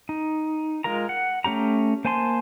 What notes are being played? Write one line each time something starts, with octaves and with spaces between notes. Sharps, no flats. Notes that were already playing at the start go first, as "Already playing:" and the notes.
D#4
G#3 F4 A#4 A#5
F#5
A3 C#4 G4 A#5
A#3 C5 G#5 A5 C6